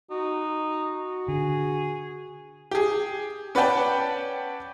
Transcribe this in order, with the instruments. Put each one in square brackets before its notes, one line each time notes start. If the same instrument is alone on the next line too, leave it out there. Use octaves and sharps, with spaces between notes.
[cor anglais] D#4 [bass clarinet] F#4
[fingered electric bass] D3 [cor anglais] G#4
[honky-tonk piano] G4 G#4
C#4 B4 D5 F#5 G5 A5